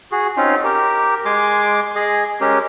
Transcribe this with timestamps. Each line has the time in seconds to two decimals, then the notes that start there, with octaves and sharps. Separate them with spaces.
0.12 F#4 G#4
0.37 C4 C#4 D#4 F4
0.64 G4 A#4
1.25 G#3 G#5 C6 D6
1.96 G#4 D#5 G#5
2.41 G#3 C#4 G4 A#4